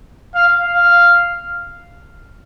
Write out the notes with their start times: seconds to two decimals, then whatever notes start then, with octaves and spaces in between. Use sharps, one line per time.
0.35 F5
0.66 F5